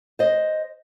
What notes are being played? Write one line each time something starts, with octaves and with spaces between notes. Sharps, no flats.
C5 D#5